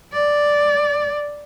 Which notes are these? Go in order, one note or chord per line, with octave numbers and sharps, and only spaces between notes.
D5